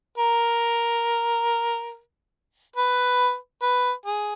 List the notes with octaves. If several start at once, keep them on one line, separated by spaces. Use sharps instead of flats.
A#4
B4
B4
G#4